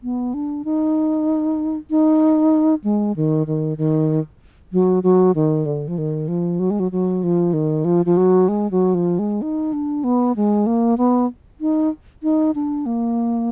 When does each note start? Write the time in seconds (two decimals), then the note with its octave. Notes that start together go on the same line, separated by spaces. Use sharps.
0.03 B3
0.34 D4
0.65 D#4
1.90 D#4
2.84 G#3
3.16 D#3
3.47 D#3
3.78 D#3
4.73 F#3
5.03 F#3
5.35 D#3
5.66 D3
5.88 F3
5.98 D#3
6.28 F3
6.60 F#3
6.71 G#3
6.80 F#3
6.92 F#3
7.23 F3
7.53 D#3
7.85 F3
8.06 F3
8.17 F#3
8.48 G#3
8.71 F#3
8.94 F3
9.19 G#3
9.42 D#4
9.73 D4
10.04 B3
10.36 G#3
10.66 A#3
10.98 B3
11.61 D#4
12.23 D#4
12.55 D4
12.86 A#3